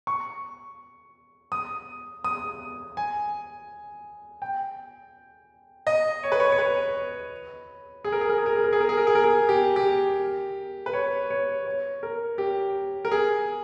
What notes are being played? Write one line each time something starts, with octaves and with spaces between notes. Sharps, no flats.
C#6
D#6
D#6
G#5
G5
D#5
C#5
B4
C#5
C#5
B4
G#4
A#4
G#4
A#4
G#4
A#4
G#4
A#4
G#4
A#4
G#4
A#4
G#4
A#4
G#4
G4
G4
B4
C#5
C#5
C#5
A#4
G4
A#4
G#4